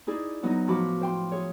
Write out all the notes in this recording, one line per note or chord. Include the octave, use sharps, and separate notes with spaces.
D#4 E4 G#4 D5
F#3 B3 D#4
A2 F3 F#4 B5 D6
C5 G5 C6
G#4 C#5